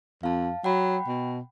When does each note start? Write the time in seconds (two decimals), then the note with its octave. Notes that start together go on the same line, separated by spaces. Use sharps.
0.23 F2 F5 A5
0.64 F#3 F#5 G5 B5
1.07 B2